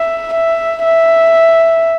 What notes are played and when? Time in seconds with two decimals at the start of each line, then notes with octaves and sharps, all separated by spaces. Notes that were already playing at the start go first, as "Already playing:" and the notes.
Already playing: E5
0.34 E5
0.85 E5